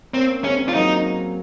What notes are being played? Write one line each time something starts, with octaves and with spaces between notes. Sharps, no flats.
A#3 C4 C#4
G#3 C4 C#4
F4
F#3 A#3 D#4